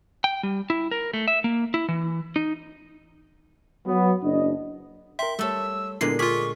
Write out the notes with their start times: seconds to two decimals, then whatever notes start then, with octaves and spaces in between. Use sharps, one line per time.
0.24 G5
0.43 G3
0.70 E4
0.91 A#4
1.14 A3
1.28 E5
1.44 A#3
1.74 E4
1.88 E3
2.36 D#4
3.86 F#3 B3
4.23 F#1 D4 D#5
5.19 A#4 E5 G5 C6
5.39 G3 A3 A4 C#5 E6
6.01 A#2 D3 G#3 B3 E4 C7
6.19 F4 G#4 C#6 D6 F6 B6